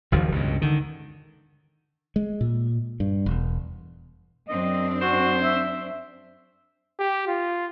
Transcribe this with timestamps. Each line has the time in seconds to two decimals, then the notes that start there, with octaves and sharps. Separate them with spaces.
0.12 F#1 D#2 D#3 F3
0.32 C#2 G2 B2
0.62 D3 D#3
2.16 G#3
2.41 A#2
3.00 G2
3.26 E1
4.48 F#2 C4 D4 D#5
5.01 F#4 C5
5.43 E5
6.99 G4
7.28 F4